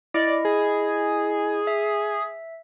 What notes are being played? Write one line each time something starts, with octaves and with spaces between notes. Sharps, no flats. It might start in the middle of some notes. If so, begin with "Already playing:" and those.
E4 D5 D#5
G#4
E5